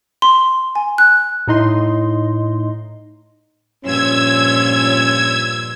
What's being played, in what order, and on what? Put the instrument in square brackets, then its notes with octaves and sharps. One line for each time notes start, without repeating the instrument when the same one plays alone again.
[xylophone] C6
G#5
F#6
[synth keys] A2 D#4 D#5 C6
[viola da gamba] G2 A#2 F3 [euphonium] C#4 [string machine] E6 G#6